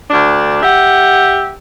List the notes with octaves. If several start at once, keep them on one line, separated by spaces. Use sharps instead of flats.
D2 D4
G4 E5 F#5